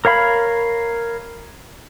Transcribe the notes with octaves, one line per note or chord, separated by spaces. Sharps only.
A#4 C#5 F5 B5